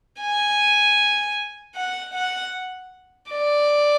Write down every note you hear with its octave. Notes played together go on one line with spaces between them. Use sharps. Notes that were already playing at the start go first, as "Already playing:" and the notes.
G#5
F#5
F#5
D5